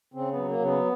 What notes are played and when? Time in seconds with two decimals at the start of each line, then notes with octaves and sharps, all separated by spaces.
0.14 C#3 C4
0.32 F#3 B3
0.48 A#3
0.59 C#3
0.65 B3